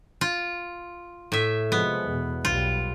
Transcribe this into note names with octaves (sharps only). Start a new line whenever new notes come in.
F4
A2 E5
C3 F3 G#3 B3
E2 B2
B1 G3 F4